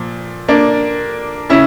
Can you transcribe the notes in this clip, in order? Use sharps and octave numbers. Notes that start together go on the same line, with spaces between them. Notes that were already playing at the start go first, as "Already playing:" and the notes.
Already playing: A#2 F3
A#3 D4
C#3 C#4 E4